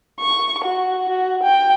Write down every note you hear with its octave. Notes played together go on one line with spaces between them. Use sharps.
C#6
F#4
F#4
G5